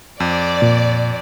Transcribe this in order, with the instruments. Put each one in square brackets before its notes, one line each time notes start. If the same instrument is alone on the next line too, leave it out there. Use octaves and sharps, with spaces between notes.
[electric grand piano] F2 [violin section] D5
[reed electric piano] A#2